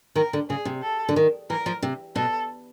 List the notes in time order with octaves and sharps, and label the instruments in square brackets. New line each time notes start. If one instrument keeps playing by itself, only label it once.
[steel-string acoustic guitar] D#3 [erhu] A#4
[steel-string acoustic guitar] D3
[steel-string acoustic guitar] C#3 [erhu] G#4
[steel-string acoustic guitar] C3
[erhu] A4
[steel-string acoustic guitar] D3
D#3
[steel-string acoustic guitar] E3 [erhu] A#4
[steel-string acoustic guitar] F3
C3
[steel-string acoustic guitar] B2 [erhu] A4